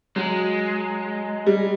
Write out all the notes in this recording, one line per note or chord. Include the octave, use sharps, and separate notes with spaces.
F#3 G#3
G3